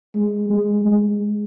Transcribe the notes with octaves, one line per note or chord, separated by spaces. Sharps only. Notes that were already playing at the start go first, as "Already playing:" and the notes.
G#3
G#3
G#3